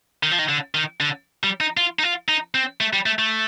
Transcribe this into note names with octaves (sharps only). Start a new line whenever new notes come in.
D#3
F3
D#3
D3
D#3
D3
G3
D#4
F4
D#4
F4
D#4
C4
A3
G3
A3
A3